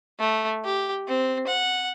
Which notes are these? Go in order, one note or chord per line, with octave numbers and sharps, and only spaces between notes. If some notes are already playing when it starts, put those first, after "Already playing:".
A3
G4
C4
F#5